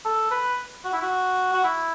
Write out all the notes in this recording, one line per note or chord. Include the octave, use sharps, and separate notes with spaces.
A4
B4
F#4
E4
F#4
F#4
E4